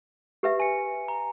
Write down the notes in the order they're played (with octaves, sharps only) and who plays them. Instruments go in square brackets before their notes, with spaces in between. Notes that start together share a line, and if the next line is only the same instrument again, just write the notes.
[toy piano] G4 B4 E5
[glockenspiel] G#5 C#7
A#5